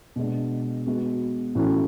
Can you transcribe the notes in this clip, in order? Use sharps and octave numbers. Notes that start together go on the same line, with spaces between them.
B2 G#3 D4
G#3 B3 F#4
A2 E3 A3 C#4 F#4